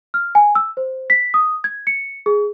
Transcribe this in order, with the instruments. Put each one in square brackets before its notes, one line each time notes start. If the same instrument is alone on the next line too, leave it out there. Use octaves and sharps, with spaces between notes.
[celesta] F6
G#5
E6
C5
B6
D#6
G#6
C#7
G#4